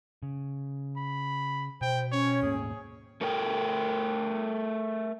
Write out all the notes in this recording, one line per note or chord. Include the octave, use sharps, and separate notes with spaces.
C#3
B5
B2 C5 G5
C#4 C#5
D#1 G#2 A#3 G#4
A3 A4 A#4 G5